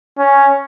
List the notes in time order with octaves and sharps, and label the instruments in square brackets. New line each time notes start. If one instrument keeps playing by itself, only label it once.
[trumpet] C#4